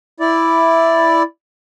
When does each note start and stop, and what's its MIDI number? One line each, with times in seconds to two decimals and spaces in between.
0.20 1.23 64
0.20 1.23 74